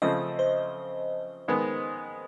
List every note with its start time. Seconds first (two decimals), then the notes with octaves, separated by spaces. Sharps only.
0.02 C#3 F3 A3 C4 D#5
0.39 C5
1.48 D#3 G#3 B3